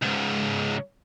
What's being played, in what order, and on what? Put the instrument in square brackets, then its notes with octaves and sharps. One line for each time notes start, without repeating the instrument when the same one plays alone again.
[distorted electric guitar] C#2 G#2